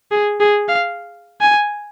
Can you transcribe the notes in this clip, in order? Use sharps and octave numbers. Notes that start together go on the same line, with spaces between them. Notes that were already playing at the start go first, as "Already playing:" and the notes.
G#4
G#4
F5
G#5